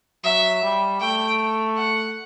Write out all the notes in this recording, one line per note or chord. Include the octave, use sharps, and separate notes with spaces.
F#3 E5
G3
A3 G5
F#5